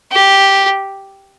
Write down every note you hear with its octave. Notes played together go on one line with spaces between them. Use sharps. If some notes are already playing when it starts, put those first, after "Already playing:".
G4